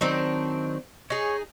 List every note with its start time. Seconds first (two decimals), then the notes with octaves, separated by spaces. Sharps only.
0.01 D#3 F#3 C4 D4 D#4
1.10 D#4 G#4 C#5